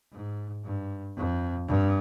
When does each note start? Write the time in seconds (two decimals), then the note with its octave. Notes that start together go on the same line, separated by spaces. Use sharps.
0.12 G#2
0.64 G2
1.16 F2
1.68 G2